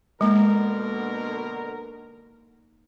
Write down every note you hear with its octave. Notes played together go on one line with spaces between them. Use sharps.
B2 D3 G#3 A#3 D#4 A#4 G#5